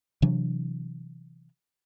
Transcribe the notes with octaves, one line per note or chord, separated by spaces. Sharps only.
C3 E3 F#3 D4